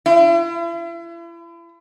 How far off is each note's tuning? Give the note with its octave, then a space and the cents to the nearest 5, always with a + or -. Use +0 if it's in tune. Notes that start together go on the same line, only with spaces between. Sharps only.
E4 +40